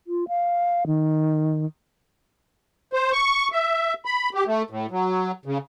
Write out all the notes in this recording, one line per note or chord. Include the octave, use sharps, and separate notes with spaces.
F4
F5
D#3
C5
C#6
E5
B5
G4
A3
A2
F#3
C#3